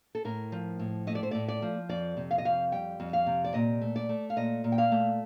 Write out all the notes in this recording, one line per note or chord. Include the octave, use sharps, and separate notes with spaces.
A4
A2 A#4
F3
A2
A3 D#5
D5
C5
A2 D5
D5
F3
F2 D5
C3
F5
D#5
F2 F5
G3 G5
F2
F5
C3
D5
A#2 D#5
A3
D5
A3
F5
A#2 D#5
A#2
G5
F5
A3